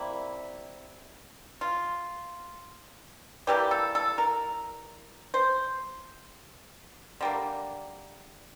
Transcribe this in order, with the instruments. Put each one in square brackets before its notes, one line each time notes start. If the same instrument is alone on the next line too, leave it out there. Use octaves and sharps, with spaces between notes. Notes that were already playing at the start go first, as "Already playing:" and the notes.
Already playing: [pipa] C3 G3 A#3 E4
F4
E3 G3 A#3 G4
A4
A4
A#4
C5
D3 G3 A#3